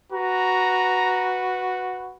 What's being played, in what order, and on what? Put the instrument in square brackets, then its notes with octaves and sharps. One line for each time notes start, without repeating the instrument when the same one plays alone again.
[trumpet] F#4 [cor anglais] B4 [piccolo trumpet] A#5